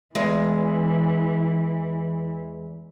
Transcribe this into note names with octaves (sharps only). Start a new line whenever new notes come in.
E2 E3 G#3